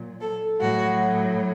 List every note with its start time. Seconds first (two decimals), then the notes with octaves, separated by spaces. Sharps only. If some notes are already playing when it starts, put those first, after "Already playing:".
Already playing: A#2 F#3
0.21 A4
0.60 A2 F#3 F#4